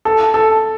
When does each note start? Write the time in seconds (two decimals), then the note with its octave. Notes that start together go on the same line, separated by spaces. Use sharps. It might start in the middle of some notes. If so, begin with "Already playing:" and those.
0.05 A4
0.34 A4